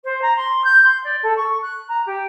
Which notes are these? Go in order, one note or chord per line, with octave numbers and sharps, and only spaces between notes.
C5
A#5
C6
G6
C6
D5
A4
C#6
F#6
A#5
G4